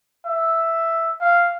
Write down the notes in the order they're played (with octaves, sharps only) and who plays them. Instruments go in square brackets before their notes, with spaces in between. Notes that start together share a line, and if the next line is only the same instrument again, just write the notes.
[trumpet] E5
F5